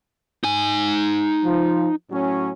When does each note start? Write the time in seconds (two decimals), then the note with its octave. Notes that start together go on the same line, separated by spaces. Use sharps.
0.44 D#4 G#5
1.44 F3
2.10 A2 F#3 C#4